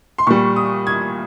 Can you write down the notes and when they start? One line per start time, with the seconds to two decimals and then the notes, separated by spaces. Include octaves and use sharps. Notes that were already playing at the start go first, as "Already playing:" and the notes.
0.18 C6
0.27 A#2 G3 C#6
0.56 D#6
0.87 G#6